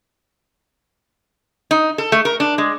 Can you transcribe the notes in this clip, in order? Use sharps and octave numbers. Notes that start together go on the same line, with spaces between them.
D#4
A4
A3
A#4
D4
G#3